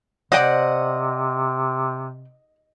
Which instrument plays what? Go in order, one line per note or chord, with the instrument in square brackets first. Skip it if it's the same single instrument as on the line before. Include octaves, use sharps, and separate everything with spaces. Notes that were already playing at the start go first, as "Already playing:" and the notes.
[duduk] C3 [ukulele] C5 D5 G5 [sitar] D#5 [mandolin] F#5